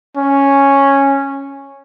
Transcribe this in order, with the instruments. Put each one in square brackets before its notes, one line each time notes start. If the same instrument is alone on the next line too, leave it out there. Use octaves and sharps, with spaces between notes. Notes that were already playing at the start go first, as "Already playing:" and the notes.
[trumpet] C#4